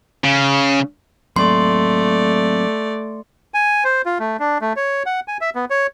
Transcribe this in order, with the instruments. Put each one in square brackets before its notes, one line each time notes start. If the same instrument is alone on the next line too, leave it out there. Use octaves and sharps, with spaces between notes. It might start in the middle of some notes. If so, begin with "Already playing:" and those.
[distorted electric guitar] C#3
[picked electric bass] F#3 A#3 C4 [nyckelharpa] A3 D5 [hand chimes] C6
[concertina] G#5
C5
F4
A3
D4
A3
C#5
F#5
G#5
E5
B3
C#5